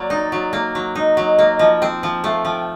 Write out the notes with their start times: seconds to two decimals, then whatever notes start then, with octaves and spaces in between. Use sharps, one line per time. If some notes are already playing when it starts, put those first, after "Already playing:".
Already playing: F#3 A#3 D5
0.10 D#4
0.32 F#3
0.53 A#3
0.75 F#3
0.95 D#4 D#5
1.17 F#3
1.39 A#3
1.59 F3
1.82 C4
2.03 F3
2.24 A3 F5
2.45 F3 G5